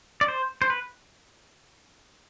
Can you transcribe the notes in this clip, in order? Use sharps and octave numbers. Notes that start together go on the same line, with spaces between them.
D5
C5
C5
B4